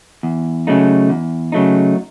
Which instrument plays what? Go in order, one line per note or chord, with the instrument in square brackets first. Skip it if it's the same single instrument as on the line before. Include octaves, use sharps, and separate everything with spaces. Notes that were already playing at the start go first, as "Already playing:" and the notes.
[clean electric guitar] E2
C#3 F#3 A3 D#4
E2
C#3 F#3 A3 D#4